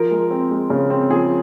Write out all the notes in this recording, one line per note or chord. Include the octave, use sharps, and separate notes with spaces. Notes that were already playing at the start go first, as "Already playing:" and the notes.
Already playing: F3 A#4
G#3
C4
G#3
C#3
C4
F3 G#4